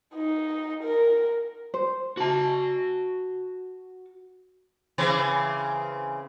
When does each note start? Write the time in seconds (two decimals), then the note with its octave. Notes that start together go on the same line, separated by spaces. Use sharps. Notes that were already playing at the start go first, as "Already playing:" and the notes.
0.15 D#4
0.84 A#4
1.74 C5
2.17 F#4 A5
4.98 C#3 E3 C4